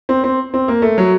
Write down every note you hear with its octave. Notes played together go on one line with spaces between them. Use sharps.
C4
C4
C4
A#3
A3
F#3